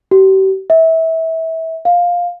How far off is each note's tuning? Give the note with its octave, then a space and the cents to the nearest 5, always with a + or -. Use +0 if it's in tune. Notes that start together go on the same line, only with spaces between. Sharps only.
G4 -40
E5 -25
F5 +10